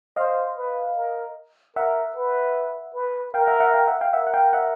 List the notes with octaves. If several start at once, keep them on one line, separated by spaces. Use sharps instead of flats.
C5 D#5 F5
B4
A#4
A#4 E5 F#5
B4
B4
A#4 F5 G5
E5 F#5
E5 F#5
F5 G5
E5 F#5
F5 G5
A#4 E5 F#5
F#5
F5 G5
E5 F#5